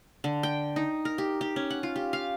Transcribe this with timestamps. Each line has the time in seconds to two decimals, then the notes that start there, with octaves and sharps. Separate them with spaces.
0.24 D3
0.43 G5
0.76 D#4
1.05 A#4
1.18 G4
1.41 G4
1.56 C#4
1.70 F#5
1.83 F4
1.96 G4
2.13 F5